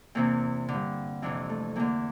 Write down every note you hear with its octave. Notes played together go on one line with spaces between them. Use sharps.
E2 C3 E3 A#3
D3
G2
F2 C3 E3 D4
A3
E2 D3 A#3